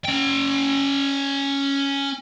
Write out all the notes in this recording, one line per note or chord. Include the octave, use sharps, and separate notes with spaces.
C#4 G5